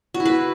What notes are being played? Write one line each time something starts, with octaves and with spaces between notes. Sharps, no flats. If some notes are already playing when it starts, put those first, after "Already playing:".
F#4
E4
B4